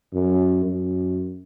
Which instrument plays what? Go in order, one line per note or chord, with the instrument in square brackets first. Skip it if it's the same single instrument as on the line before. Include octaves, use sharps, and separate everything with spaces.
[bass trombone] F#2
F#2